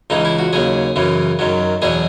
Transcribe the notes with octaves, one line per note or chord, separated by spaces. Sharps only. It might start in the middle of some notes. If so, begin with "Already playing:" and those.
C#2 C#3 E3 D#4
E4
F#4
D#2 C#3 F#3 G#4
F#2 C#3 E3
F#2 D#3 F#3
E2 B2 F#3 G#4